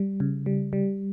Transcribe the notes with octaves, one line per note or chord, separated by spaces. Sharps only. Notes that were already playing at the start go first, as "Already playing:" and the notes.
Already playing: G3
C#3
G3
G3